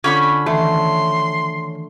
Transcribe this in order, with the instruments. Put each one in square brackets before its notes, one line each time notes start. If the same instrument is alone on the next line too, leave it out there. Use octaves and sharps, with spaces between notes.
[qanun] D3 [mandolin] C#4 B5 C#6 [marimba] F4 D6 G6
[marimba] D#3 E3 [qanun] A3 [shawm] C6